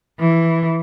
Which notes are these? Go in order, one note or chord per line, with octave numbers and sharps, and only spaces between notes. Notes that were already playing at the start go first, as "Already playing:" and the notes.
E3